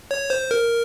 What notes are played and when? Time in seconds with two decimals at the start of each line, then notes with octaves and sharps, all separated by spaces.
0.11 C#5
0.30 C5
0.51 A#4